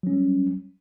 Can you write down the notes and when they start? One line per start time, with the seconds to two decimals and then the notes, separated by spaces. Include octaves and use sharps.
0.03 F#3
0.07 C#4
0.10 G3